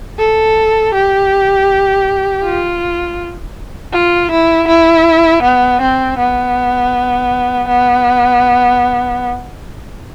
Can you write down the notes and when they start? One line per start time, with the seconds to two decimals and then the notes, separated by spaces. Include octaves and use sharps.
0.19 A4
0.94 G4
2.44 F4
3.93 F4
4.31 E4
4.68 E4
5.43 B3
5.81 C4
6.18 B3
7.68 B3